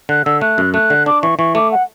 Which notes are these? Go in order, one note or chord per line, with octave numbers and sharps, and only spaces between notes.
D3 F#6
D3 E6
A3 F#6
F#2
A3 F#6
D3
D4 D6
E3 C#6
E3 C#6
A3 D6
F#5